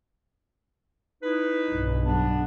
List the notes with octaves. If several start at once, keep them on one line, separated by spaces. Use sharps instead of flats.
D#4 E4 B4
B1 G2
B3 D4